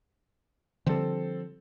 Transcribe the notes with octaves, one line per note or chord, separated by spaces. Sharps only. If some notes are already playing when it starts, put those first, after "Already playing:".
D3 F3 G3 C4 A4